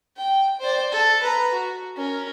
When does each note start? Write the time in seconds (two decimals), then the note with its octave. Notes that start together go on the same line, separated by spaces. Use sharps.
0.17 G5
0.60 C5 D5
0.92 A4
1.23 B4 A#5
1.53 F#4
1.96 C#4 A#4